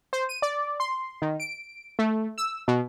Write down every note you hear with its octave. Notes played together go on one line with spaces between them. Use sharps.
C5
D#7
D5
C6
D#3
D7
A3
E6
B2